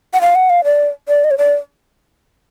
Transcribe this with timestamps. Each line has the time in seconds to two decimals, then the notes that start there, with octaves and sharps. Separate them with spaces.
0.14 F#5
0.21 F5
0.35 F#5
0.50 F5
0.64 D5
1.08 D5
1.24 D#5
1.31 C#5
1.38 D5